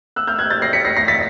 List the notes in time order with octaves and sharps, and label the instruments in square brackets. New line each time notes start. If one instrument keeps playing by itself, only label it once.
[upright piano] E6 F#6
F6 G6
F#6 G#6
G6 A6
A#6 C7
B6 C#7
A#6 C7
A#6 C7
A6 B6